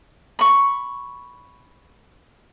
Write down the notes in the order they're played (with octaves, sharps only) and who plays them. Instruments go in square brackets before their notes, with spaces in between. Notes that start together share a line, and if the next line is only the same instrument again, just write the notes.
[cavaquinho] B5 C#6